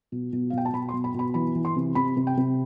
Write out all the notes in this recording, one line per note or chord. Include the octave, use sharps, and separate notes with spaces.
B2
B2
F5
B2 G5
A5
B2 B5
C6
B2
B5
B2 B5
E3 B5
E3
C6
C3
C3 B5
C3
G5
C3